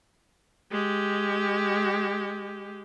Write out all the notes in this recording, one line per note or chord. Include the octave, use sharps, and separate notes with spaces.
G#3 G4